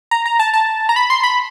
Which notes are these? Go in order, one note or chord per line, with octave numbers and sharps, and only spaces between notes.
A#5
A#5
A5
A5
A#5
B5
C6
B5